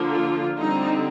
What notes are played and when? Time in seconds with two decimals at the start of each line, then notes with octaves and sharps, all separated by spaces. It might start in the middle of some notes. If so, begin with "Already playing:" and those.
Already playing: D3 F3 A#3
0.14 F4
0.58 D3 G3 C4 D#4